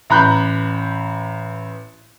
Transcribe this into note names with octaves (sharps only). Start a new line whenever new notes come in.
A1 A#5 B5 F#6 G6